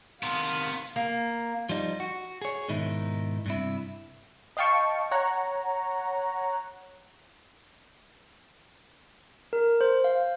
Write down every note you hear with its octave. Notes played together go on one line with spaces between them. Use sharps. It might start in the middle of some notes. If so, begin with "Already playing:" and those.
C3 D#3 B3 F5
A#3
F3 G3 D#4
F#4
G#4 C#5
G#2 B2 D#3 D#4 E4
G2 C3 E4
D#5 F5 G5 A5 C#6
C#5 F#5 A#5
A#4
C5
F5